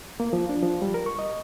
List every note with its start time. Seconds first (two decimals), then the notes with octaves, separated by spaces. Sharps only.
0.20 A#3
0.33 F3
0.49 D4
0.63 F3
0.82 G3
0.94 A#4
1.06 C#6
1.19 D#5